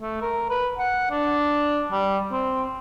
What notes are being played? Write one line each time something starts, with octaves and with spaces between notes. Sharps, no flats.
A3
A#4
B4
F#5
D4
G3
C4